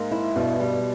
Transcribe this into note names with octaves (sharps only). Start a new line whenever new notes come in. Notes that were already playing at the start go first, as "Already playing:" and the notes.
Already playing: G#2 A#3
E4
G2 B2
G3